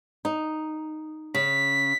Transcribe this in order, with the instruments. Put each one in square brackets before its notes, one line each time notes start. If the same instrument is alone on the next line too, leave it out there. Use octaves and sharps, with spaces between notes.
[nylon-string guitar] D#4
[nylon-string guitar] C#3 [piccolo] B6